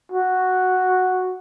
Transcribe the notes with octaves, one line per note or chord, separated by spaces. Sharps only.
F#4